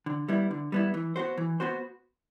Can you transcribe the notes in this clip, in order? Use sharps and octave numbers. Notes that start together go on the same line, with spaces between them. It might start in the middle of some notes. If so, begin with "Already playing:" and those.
D3
G3 B3 E4
D3
G3 B3 E4
E3
B3 F#4 C5
E3
B3 F#4 C5